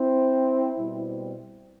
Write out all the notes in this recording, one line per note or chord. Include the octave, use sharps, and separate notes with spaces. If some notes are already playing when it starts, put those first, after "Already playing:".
Already playing: C4 E4
B2 G3 C4